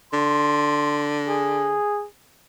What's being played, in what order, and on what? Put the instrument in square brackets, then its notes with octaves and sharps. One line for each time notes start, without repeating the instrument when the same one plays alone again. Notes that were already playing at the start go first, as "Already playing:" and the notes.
[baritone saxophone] D3 [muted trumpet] C6
[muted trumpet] G#4